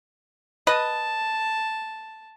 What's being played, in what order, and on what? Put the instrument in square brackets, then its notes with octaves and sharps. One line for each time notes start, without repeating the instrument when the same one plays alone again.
[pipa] B4 D#5 [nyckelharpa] A5